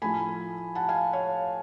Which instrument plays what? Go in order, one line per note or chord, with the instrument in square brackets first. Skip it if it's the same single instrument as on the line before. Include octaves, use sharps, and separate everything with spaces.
[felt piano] A2 F3 A3 G#5 B5
F#5 A5
F5 G#5
C#5 F5